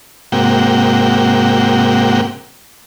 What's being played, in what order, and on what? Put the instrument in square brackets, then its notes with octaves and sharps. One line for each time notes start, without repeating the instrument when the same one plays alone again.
[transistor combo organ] G#2 C3 A#3 F#4 G5